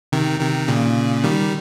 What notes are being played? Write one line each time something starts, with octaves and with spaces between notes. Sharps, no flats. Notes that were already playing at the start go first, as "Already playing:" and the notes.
C3 D#3
C3 D#3
A#2 C#3
D#3 G3